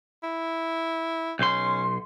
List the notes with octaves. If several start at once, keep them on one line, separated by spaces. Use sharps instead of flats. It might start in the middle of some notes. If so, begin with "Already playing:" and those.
E4
B1 C#4 C6